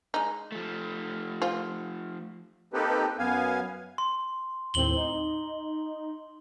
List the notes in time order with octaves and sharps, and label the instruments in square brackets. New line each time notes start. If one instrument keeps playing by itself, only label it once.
[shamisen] G#3 D#4
[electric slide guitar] F3 A3
[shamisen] F4 C5
[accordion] A#3 C4 D#4 G4 A4 B4
F#2 B3 F5 G#5
[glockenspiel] C6
[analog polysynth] D#2 A2 C4 [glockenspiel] F#7 G7
[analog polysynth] D#4